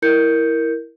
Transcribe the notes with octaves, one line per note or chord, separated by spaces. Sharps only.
E4 A#4 G6 C#7